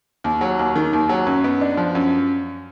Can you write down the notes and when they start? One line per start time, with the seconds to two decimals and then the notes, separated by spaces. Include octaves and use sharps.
0.24 D#2
0.41 F#3
0.59 D#2
0.76 D#3
0.93 D#2
1.09 F#3
1.26 F#2
1.44 B3
1.61 D4
1.77 F3
1.95 F#2